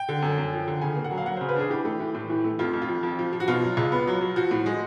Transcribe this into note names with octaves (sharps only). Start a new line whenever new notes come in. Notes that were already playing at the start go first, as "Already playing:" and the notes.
Already playing: G5
D3
F#2
F#2
F3
D3
C#3 G#5
A#3
F#5
F#3
F5
F#3 F#5
C#3 C5
B4
D4 G#4
E3 G4
A3
E3
A2
E3
A3
F2 F4
F2
F4
F3
F2
F3
F3
F#4
B2 F4
F#3
C#2
B3
F#3
F#3
F3 F#4
A2
G#3